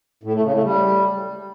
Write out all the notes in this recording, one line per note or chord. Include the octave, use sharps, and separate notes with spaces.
A2
A3
C#3
A3
G3